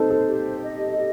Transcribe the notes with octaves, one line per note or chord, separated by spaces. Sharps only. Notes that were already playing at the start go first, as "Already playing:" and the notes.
Already playing: C4 D#4 A4 C5
A4
G4
D#5
G4